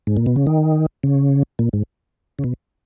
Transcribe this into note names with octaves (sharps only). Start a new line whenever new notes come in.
G#2
A#2
B2
C#3
D#3
C#3
A#2
G#2
C#3
B2